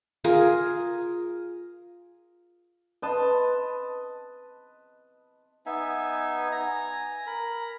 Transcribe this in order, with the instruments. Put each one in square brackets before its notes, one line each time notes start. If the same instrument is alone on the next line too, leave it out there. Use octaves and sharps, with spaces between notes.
[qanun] F4 G#4 A#4
[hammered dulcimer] B4 D#5 A5 C6
[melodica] B3 D#4 E5 G#5
G#5 A#5
A#4 A#5 B5